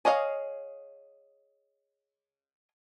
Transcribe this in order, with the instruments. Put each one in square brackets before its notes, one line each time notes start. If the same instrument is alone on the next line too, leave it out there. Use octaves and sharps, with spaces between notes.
[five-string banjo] G#4 C#5 D#5 F5